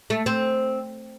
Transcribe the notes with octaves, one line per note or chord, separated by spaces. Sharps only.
A3
C4